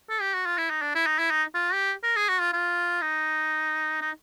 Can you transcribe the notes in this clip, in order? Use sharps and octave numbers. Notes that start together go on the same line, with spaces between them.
A4
G4
F#4
F4
E4
D#4
D4
E4
D#4
E4
D#4
F4
G4
A#4
G#4
F#4
F4
F4
D#4
D#4